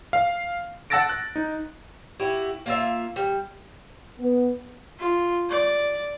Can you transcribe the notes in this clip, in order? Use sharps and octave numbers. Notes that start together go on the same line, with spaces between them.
F5
F#5 A5 E6 A6 A#6 D7
F#6
D#4
E4 F#4 G4
A#3 F4 E5
G3
B3
F4
D5